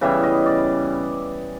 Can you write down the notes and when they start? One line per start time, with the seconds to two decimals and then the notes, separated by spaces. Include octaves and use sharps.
0.01 C#3 E3 G3 B3 E5
0.23 D#5
0.46 D5